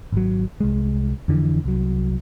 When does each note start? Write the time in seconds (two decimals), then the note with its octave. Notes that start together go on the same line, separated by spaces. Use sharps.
0.12 G#1 F#3
0.61 C2 G#3
1.28 F2 D3 E3
1.64 C2 F#3